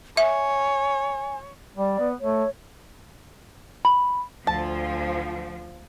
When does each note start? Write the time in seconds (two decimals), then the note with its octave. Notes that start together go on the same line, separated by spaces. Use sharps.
0.17 C#5 E5 G#5
1.77 G3 D5
1.99 B3
2.21 A3 C#5
3.85 B5
4.47 D2 F3 A5